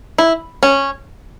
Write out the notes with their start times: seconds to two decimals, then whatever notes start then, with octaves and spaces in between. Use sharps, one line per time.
0.18 E4
0.63 C#4